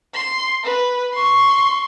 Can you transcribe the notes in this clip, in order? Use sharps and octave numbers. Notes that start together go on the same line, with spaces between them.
C6
B4
C6 C#6